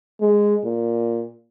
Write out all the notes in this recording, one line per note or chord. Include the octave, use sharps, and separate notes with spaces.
G#3
A#2